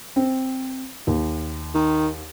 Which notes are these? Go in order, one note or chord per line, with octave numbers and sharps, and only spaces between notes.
C4
D#2
D#3